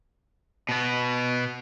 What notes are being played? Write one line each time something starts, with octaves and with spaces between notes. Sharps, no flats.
B2 B3